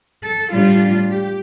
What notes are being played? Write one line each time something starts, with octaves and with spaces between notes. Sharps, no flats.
A4
A2 G3 D4 F4
G4